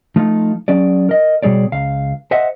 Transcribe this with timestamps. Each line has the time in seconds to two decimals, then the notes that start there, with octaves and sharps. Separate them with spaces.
0.16 F3 A3 D#4 F4
0.68 F#3 C#4 G#4 D5
1.09 A#4 D#5
1.43 B2 G3 G#4 C#5 D5
1.72 C#2 F5
2.31 C5 D#5 E5 F#5